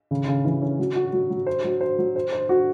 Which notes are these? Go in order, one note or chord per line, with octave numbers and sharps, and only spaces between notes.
C#3
C#3
E3
C#4
F#3
F#4
F#3
F#3
C5
F#3
C5
F#3
C5
C5
F#4